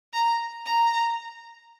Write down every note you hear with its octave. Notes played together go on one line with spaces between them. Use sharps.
A#5
A#5